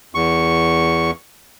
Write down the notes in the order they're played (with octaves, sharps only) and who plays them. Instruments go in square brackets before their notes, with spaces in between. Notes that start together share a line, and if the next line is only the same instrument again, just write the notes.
[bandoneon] E2 C#6